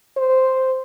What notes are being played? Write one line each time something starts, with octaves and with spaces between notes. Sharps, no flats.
C5